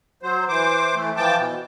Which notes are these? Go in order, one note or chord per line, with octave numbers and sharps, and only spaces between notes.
F#3 C5
E3 C5 D6
E3 A3
E3 F3 G5 A5 D6
B2 E3